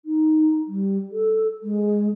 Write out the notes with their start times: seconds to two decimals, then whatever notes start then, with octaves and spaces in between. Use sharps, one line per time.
0.05 D#4
0.68 G3
1.12 A4
1.63 G#3